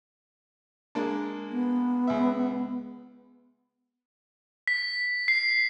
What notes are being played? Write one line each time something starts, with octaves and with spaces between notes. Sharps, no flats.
G#3 A#3 D4
B3
C#2 E5
B6
C7